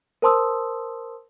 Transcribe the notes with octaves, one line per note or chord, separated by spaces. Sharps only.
A#4 C5 A5 C6 D#6 E6